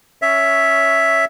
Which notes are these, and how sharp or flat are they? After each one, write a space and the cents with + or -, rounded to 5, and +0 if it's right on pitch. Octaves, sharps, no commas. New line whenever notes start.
C#4 +0 C#5 +10 E5 +0